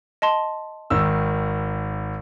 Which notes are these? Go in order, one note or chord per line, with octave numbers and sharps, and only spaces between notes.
D#5 A5 C6
G#1 D#3 E6